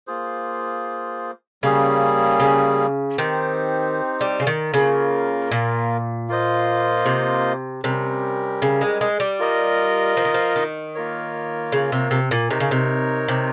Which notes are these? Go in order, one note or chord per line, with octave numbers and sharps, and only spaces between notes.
A#3 F4 G#4 C5
C#3 G3 A#3 C#4 G#4
C#3
D#3 C4 D#4 G4 C5
G3
C#3
D#3
C#3 A#3 F4 A#4
A#2
A#3 F4 C5 D#5
C3
C3 G3 C#4 G4 A#4
C#3
G#3
G#3
G3
F4 A#4 D#5
F3
D#3
F3
D#3
A#3 F4 A#4 C#5
C#3
C3
C3
A#2
C3 D#4 A#4 C#5
C#3
C3
C3